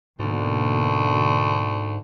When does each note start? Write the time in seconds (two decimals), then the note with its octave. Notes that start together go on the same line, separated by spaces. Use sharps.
0.19 D2 G#2 B2 D3 A#3